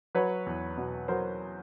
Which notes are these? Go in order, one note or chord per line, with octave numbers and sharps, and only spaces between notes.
F#3 B4 C#5
E2
B2
F#3 A#4 C5